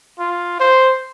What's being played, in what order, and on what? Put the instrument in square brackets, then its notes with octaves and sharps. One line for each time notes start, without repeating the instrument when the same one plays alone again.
[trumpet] F4
C5